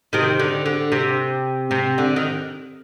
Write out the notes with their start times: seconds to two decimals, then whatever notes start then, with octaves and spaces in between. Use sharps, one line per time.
0.13 C3 D#3
0.40 D3
0.66 D3
0.92 C3
1.71 C3
1.98 D3
2.16 D#3